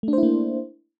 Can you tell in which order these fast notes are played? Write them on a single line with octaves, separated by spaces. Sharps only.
A3 D4 C5 E4 A#3